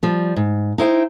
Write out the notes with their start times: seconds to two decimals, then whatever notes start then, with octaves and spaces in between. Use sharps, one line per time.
0.03 F3 G3
0.36 G#2
0.78 D#4 E4 C5 G5